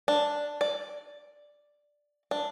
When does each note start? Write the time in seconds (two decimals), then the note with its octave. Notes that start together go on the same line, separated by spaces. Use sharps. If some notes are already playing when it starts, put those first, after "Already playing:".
0.08 D4
0.61 D5
2.31 D4